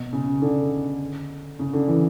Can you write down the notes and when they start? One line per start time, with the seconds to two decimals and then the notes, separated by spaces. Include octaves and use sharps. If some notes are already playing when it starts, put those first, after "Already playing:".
Already playing: B2
0.13 C#3
0.42 D3
1.59 C#3
1.73 D3
1.88 E3